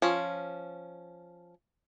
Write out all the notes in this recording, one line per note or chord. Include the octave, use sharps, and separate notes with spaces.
F3 C#4